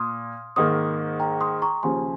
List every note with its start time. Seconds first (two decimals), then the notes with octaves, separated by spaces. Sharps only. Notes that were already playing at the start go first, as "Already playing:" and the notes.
Already playing: A#2 C6 D#6 F6
0.56 G#2 D#3 A#3 C6 D#6
1.20 G5 A#5
1.41 C6 D#6
1.62 A#5 C#6
1.83 D#2 C#3 F3 G#5 C6